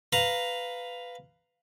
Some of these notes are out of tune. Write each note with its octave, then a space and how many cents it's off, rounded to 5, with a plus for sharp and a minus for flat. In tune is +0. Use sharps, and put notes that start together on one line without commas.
B4 +10 F5 +0 A#5 +0